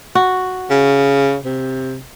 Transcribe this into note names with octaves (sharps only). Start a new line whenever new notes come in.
F#4
C#3
C3